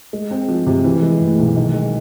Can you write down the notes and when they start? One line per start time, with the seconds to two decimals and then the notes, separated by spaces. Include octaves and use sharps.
0.13 G#3
0.31 C4
0.49 F3
0.67 C3
0.84 E3
1.02 G#3
1.20 A2
1.39 B1
1.56 D#3
1.74 G#3